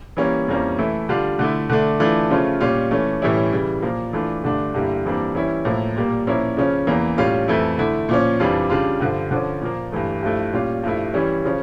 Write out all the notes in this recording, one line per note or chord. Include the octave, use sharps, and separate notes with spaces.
E3 G3 A#3 C#4
F2 E3 G3 A#3 C#4
E3 A3 E4
D3 G3 D4 F4
D3 A3 E4
D3 A3 D4
E3 A3 D4 F4
C#3 F3 A3 C#4 F4
A#2 G3 C#4 F4
E3 A3 C#4
A2 E3 G3 C#4 E4
C#3 E3 G3
A#2 F3 A#3
E3 A3 D4 F4
G2 D3 A3 D4
G2 D3 G3 A#3 E4
F2 E3 G3 A#3 D4
E3 G3 C#4 E4
A2 F3 A#3 E4
A#2 G3 A#3
A#2 F3 A#3 C#4 E4
C#3 F3 C#4
E2 E3 A#3
A2 G3 C#4 F4
F2 E3 A3 E4
D3 A3 E4
A#2 F3 C#4
F2 E3 G3 D4 F4
C#3 G3 D4 F4
G2 D3 F3
D3 F3 C#4
A#2 F3 A#3
G2 E3 A3
G2 F3 A3 E4
A#2 G3 C#4 F4
G2 F3 A3 E4
E3 G3 C#4
C#3 F3 C#4